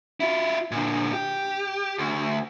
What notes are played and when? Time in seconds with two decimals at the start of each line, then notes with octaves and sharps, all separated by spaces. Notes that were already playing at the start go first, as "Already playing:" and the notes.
0.20 E4 F4
0.71 A#2 D3
1.13 G4
1.98 D2